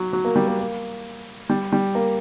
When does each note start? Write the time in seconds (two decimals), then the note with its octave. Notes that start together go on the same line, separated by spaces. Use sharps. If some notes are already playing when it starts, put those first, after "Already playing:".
Already playing: F#3
0.13 F#3
0.25 A#3
0.36 G3
0.47 A#3
0.59 A#3
1.50 G3
1.72 G3
1.95 A#3